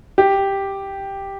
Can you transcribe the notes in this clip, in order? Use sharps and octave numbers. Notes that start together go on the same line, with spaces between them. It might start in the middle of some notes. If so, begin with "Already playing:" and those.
G4